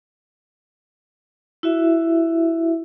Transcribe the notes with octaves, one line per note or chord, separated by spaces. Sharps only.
E4 F#4 E5